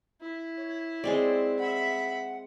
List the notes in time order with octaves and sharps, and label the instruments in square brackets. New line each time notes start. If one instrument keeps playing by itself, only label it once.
[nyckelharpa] E4
[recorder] C#5
[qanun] G#3 C4 D5
[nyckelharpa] E5 B5 [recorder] F#5